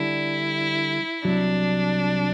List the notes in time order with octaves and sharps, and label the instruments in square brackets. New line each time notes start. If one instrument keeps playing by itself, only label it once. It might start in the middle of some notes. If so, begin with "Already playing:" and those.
Already playing: [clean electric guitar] D3 G3 D4 [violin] E4
[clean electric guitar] C2 C3 F#3 [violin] D4